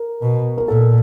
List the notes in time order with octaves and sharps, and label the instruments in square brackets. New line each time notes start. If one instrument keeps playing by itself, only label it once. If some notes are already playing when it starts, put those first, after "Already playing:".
Already playing: [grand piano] A#4
[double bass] B2
[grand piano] A#4
[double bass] A#2 [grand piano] A4